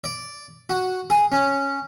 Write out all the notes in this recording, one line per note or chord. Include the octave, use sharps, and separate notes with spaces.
D5
F#4
G#4
C#4